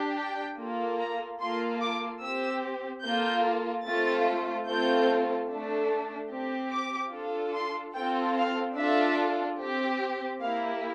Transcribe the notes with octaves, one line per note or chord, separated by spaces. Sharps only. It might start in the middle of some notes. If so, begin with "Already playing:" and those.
Already playing: D4 G4
G5
A#3 F4 A4
A#5
A#3 F4 A4 C6
D6
C4 G4 E6
A#3 F4 A4 G6
A3 C4 F4 A4 A6
A3 C4 F4 A4 G6
A3 D4 A4
C4 G4
D6
D4 F4 A4
C6
C4 F4 A4 G5
F5
D4 F4 A4 E5
C4 G4
A#3 E4 G4 F5